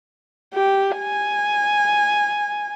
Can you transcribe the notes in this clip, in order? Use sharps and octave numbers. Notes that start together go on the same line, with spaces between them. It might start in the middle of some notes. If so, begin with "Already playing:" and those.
G4
G#5